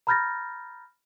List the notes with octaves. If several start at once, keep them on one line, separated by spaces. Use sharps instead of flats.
A#5 B5 F6 G6 A6 A#6